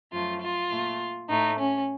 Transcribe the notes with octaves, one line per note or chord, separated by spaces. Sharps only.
F#2 F3 A3 F4
F4
A#2 A3
A2 A3 D#4
C#4